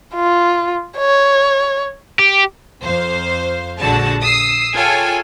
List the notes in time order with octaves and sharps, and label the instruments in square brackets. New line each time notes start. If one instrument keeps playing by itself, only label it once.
[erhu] F4
C#5
[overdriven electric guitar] G4
[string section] F2 C5 F5
A#1 D3 G#3 F#4 A5
D#6 E6 C7
F4 G#4 A4 C#5 G5 G#5